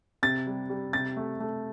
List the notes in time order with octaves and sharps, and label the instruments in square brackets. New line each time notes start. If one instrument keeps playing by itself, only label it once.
[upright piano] C3 A6
G3
G3
C3 A6
A3
A3